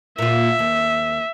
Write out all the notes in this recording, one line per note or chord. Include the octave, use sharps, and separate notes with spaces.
A#2 F4 E5
D#2